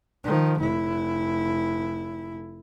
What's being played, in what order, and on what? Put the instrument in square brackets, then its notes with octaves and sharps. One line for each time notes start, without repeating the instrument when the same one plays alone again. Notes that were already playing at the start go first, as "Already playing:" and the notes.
[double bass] D#3 F3
F1 E4